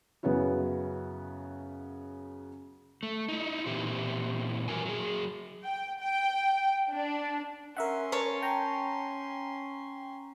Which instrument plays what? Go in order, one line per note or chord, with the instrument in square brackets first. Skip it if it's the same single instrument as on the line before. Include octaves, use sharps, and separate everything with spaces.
[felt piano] F#2 C#3 B3 C#4 E4 F#4
[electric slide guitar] A3
D#4 E4
A#2 E3 C4 E4 G4
E3 F#3 A#4 G#5
F#3 G#4
[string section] G5
G5
D4
[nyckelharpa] C#4 C6 [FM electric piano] A#4 E5 F#5
[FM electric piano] A#4 [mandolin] C#5 A5
[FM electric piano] G5 A#5